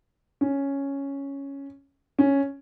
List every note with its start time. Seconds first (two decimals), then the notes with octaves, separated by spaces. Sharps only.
0.41 C#4
2.19 C#4